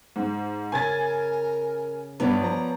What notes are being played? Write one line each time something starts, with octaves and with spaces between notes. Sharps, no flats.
G#2
C#3 A#4 G#5 G#6 A6
G2 B3 C#5 D5
F3 A#5